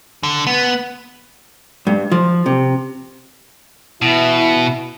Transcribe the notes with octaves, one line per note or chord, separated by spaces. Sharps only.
D3
B3
G2
F3
C3
B2 E3 E4